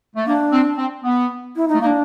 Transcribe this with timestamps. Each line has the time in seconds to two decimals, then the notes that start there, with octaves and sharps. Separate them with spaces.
0.16 A3
0.26 A#3 D4
0.53 C4
0.78 C4
1.04 B3
1.56 E4
1.68 D#4
1.74 A3
1.81 A#3 D#4
1.86 D4